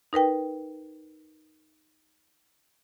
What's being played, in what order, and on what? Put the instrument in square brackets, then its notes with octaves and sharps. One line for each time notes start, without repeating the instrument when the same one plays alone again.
[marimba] D#4 A#4 B4 G5